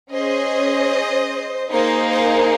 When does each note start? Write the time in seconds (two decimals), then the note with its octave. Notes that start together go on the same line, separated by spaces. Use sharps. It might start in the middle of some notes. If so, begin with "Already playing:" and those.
0.12 C#4 G#4 C5 D#5
1.71 A#3 D#4 G#4 C5
2.11 C5